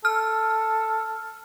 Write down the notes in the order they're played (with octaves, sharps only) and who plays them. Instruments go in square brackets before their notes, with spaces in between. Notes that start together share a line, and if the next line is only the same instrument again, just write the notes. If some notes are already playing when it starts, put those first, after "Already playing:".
[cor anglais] A4 [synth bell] F6